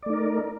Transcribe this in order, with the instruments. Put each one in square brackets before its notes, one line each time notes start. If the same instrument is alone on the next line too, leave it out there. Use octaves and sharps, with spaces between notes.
[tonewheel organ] D5
A3
D#4
A#4